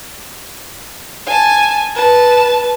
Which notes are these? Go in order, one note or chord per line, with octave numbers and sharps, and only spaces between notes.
G#5 A5
B4 A5